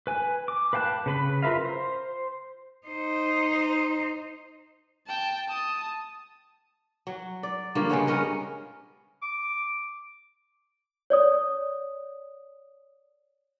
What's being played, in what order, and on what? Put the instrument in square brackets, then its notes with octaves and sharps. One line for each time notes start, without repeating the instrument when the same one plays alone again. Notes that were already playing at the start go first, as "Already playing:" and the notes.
[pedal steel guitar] B4 G#5
D6
B4 F5 G5 A5 F#6
C#3 B4 B5
F4 A#4 B4 E5 F5
C5
[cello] D#4 C5
[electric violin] G5 A5
A5 D#6
[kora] F#3
D5
G2 D3 F3 A#3
C#3 G#3 B3 C#5
G2 C#4 A#4 B4
[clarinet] D6
[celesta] C#5 D5 D#6